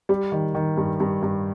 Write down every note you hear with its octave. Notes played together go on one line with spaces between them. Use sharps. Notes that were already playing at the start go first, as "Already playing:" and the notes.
G3
D#3
D#3
G2
G2
G2